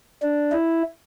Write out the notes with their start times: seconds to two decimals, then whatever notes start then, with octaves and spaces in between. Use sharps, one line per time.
0.22 D4
0.52 E4